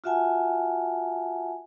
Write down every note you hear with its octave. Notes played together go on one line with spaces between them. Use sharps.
F4 F#4 E5 F#5 G#5 A5